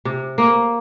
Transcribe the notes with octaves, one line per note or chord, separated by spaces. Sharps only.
C3
A#3